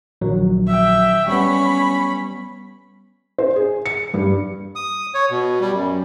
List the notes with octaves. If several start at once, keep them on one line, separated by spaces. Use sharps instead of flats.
A#1 D#3 F#3
E5 G5
G3 B3 C#4 B5
C5
G#4
C#7
G2
D#6
C#5
B2
G3
F#2